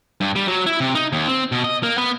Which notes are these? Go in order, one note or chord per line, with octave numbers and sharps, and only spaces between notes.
G2
G3
F#3
E4
C3
D#4
D#2
C4
B2
D#5
A#3
B3